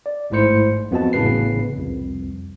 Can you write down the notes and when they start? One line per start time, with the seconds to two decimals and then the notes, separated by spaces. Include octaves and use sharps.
0.06 D5
0.30 A1 G#2 A3 E4 C5 C#7
0.91 F2 B3 F#4 D#5 A5
1.13 A1 A2 C#3 B3 B4 C7
1.77 C2 F2